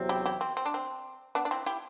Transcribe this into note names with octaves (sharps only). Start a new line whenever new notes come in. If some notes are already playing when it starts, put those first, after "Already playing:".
Already playing: E2 C3 F#3 C4
E4 G4
E4 G4
C4
C4
D4
C4
B3 D4
D4
C4 E4
E4 G4